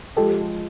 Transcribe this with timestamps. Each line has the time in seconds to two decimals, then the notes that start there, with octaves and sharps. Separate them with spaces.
0.16 F3 G#3 G4 A4